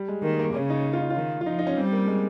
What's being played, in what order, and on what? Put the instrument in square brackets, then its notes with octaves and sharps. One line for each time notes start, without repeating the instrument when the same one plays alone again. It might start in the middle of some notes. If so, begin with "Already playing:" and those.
Already playing: [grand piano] G3
G#3
[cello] D#3 [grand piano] A#3
[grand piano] A#3
[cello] C#3 [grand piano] C#4
[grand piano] D#4
F4
D#4
[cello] D#3 [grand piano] F4
[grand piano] F4
[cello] F3 [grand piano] D#4
[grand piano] D#4
C#4
[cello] G3 [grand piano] C4
[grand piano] A#3
G#3